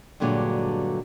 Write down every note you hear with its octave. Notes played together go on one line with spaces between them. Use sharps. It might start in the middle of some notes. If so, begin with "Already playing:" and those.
G2 A#2 D3 F#3 G#3